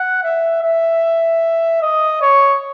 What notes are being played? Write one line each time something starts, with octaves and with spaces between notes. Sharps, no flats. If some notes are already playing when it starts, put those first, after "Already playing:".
Already playing: F#5
E5
E5
D#5
C#5